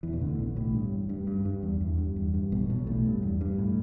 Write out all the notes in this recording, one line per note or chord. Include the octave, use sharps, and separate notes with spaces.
E2 E3
B2
D2 D3
B1 B2
A1 A2
G2
G2
G2
G2
E2
E2
G2
E2
G2
B1 B2
B1 B2
A1 A2
G2
E2
G2
A2